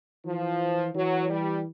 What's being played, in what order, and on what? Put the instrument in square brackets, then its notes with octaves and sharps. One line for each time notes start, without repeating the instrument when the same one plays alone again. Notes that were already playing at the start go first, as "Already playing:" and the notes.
[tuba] E3 [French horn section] F3
[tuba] E3 [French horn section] F#3
[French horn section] G3